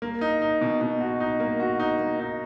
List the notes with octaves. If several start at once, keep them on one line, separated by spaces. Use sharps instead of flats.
A#3
D#4
D#4
B2
B2
F#4
D#4
A#3
F#4
D#4
A#3
D#4